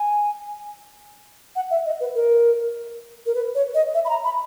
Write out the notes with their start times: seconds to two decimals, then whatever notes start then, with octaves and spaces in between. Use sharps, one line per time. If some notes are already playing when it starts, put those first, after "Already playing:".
Already playing: G#5
1.56 F#5
1.71 E5
1.86 D#5
2.00 B4
2.15 A#4
3.26 A#4
3.35 B4
3.55 C#5
3.75 D#5
3.94 E5
4.05 B5
4.09 A#5
4.25 B5